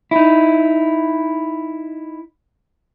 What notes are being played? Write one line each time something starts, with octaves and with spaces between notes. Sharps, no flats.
D#4 E4